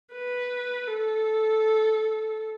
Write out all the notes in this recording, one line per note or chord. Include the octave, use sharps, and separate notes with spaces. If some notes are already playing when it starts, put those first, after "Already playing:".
B4
A4